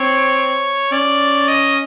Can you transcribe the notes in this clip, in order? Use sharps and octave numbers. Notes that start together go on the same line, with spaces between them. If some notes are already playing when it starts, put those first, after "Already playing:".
Already playing: C4 C#5
C#4 D5
D#5